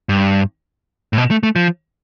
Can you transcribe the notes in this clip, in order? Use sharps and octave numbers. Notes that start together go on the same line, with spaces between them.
G2
A2
B2
A3
A3
F3